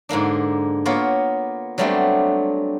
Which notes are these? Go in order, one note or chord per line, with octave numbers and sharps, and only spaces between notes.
G#2 D3 A#3 D4
A#3 B3 F4 C#5
F#3 G3 A3 B3 C4 D4